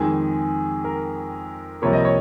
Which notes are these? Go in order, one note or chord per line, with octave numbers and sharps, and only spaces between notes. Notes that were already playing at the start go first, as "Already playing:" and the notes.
Already playing: F2 D#3 G#3 G#4
A#4
C2 C3 F3 A#3 C#5
D#5
C#5